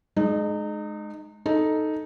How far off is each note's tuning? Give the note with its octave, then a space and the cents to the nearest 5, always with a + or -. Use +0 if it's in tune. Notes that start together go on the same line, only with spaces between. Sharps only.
G#3 +25 D#4 -30
D#4 +0 A4 +0